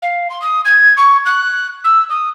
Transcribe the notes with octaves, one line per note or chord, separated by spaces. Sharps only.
F5
C6
D#6
G#6
C#6
F#6
E6
D#6